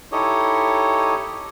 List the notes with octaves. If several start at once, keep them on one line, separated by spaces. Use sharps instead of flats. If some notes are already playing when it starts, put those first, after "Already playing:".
D#4 E4 G4 A4 C#5 D#5